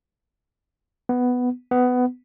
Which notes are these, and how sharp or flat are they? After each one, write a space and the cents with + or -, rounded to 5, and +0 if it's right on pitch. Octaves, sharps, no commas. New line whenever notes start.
B3 +5
B3 +15